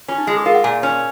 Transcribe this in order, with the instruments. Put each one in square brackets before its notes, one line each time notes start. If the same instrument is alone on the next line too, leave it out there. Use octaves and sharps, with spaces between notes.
[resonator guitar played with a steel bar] C#4 [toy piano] F4
[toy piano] D#4
[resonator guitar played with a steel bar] G#3 [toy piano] F4
[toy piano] G#4
[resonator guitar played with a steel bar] F4 [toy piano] A#4
[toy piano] F#5
[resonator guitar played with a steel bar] A#2 [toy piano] G#5
[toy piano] F5
[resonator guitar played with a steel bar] C#4 [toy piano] C#5